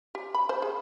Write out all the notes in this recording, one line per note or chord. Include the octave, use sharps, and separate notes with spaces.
G4
B5
C5
G#4